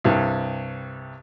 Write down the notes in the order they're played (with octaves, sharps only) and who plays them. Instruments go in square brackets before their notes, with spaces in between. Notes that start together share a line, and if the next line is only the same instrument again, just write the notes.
[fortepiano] C2 G2